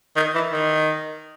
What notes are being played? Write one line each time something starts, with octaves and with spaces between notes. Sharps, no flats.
D#3
E3
D#3